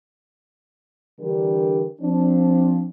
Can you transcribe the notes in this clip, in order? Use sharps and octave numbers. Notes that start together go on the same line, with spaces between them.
D3 E3 G3 D4 G4 A#4
F3 C4 D4